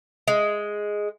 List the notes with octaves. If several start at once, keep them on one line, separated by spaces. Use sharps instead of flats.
G#3